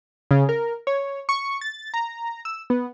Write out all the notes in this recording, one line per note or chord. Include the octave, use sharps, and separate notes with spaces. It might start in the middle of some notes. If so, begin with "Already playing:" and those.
C#3
A#4
C#5
C#6
A6
A#5
E6
B3